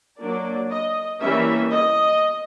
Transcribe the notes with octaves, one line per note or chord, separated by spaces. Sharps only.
F#3 A#3 D4 D5
D#5
E3 G3 A#3 C#4 E5
D#5